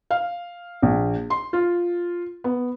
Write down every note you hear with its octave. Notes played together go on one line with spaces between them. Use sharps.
F5
A#1
C6
F4
B3